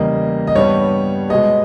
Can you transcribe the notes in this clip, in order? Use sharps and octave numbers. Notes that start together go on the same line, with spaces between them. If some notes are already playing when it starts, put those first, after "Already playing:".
Already playing: E2 C#3 G3 A#3 D#5
D#5
G2 G3 B3 C#5
B2 G#3 B3 D#5